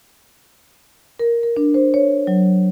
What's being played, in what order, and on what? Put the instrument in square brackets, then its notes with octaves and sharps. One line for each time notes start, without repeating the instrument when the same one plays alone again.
[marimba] A#4
A#4
D4
C5
C#5
F#3